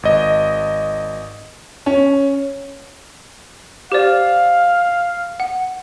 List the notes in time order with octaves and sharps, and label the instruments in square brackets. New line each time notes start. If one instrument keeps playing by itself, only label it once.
[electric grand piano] G#1 D#5
[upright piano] C#4
[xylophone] G4 C5 D5 [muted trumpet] F5
[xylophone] F#5